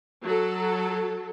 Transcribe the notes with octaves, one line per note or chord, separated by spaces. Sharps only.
F#3 A4